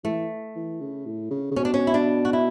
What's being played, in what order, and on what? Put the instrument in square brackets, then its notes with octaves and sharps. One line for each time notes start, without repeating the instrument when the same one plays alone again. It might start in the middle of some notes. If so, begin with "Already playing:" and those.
[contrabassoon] E3 [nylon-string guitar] A3
[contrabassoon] E3
C#3
A2
C#3
C#3
[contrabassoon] B2 [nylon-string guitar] C#4
[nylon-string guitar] D4
C#4
E4
D4
F#4
E4